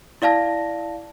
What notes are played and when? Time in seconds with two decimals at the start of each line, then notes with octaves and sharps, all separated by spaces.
0.22 E4 D5 F5 A5 A#6